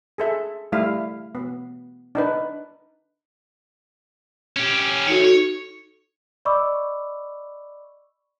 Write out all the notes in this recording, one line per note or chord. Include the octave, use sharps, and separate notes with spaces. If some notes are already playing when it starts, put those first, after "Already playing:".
G#4 A4 E5
G3 A3 E4 F5
B3
D4 D#4 B4
C#4 G4
E2 D#4 F#4 A4 C#5
C#5
D5 D#5 B5 C#6 D6 E6